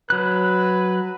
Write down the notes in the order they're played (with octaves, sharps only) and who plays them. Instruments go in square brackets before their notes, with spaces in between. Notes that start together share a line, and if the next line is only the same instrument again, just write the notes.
[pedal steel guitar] F#3 F#6 [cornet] B4